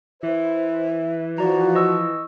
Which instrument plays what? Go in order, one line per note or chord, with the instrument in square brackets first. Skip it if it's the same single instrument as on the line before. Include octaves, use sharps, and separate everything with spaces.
[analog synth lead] E3 [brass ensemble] B4 C5 [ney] E5
[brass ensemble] F3 [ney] F#4 [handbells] D5 A#5
[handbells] D#5 C#6 E6